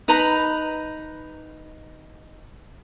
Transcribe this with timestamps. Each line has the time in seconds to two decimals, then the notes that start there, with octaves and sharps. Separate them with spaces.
0.08 D#4 B4 A#5 B5